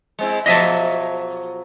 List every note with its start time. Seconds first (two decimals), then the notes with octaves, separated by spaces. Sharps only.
0.19 G#3 C4 E4
0.46 B2 F3 F#3 D#5 E5 A5